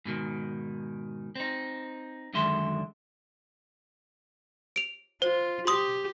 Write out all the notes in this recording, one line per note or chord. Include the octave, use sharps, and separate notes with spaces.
G#2 B2 D#3
C4 D#4
F#2 D3 D#3 G#3 E5 C6
D7 F7
F4 C5
G4 C6 D#6